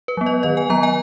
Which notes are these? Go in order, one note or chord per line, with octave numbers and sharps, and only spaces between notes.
B4
F#3 B3
D#5
D#3 D#5
G#5
F#3 B3 A#5
G#5